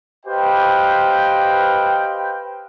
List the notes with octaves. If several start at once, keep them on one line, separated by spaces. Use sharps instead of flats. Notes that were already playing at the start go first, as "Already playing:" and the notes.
G4 B4 C5 D#5 F5 G5